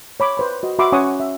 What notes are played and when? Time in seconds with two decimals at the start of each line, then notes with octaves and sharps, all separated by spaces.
0.20 C#5 B5 D6
0.37 B4 C5 B5
0.63 F#4 D#5
0.79 F#4 E5 B5 C6 D6
0.92 C#4 C#5 F#5 G#5 C#6 D#6
1.20 E5